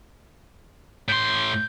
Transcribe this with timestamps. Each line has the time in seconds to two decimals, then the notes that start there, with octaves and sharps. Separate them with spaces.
1.08 A2 C6 G6